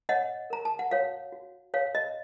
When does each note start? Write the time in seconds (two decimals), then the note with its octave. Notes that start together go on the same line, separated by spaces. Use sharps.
0.09 C#5 D#5 F#5
0.50 A#4 A#5
0.65 A5
0.79 F#5
0.91 F#4 C#5 F5
1.32 F#4
1.74 C#5 F5
1.95 D#5